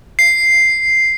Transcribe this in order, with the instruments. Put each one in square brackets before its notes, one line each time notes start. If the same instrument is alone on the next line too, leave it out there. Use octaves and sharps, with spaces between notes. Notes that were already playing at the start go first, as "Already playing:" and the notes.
[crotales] C7